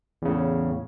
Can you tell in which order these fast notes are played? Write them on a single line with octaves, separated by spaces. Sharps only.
E2 C#3 A2